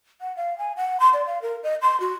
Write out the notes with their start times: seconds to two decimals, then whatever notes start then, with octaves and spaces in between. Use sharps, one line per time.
0.21 F#5
0.37 F5
0.58 G#5
0.77 F#5
1.00 C6
1.13 D5
1.26 F5
1.42 A#4
1.63 D#5
1.82 C6
2.00 F#4